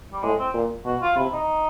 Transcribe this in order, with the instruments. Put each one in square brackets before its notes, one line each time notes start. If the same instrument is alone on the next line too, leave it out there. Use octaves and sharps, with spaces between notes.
[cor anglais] G3
[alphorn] A2 [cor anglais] G#3
[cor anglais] C4
[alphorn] A#2
[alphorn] B2 [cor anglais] F#4
[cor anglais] F4
[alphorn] C3 [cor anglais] E4
[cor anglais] D#4